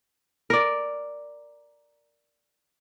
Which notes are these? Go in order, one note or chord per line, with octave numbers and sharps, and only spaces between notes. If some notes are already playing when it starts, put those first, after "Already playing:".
A#4 D5